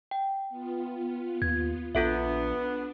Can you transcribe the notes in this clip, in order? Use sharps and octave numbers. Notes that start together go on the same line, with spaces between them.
G5
B3 F4
D#2 G#6
A#1 B3 D4 F4 A4 E5